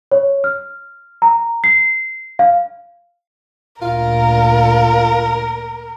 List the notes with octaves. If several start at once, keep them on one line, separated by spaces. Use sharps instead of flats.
C#5
F6
A#5
C7
F5
D2 A#2 F4 A#4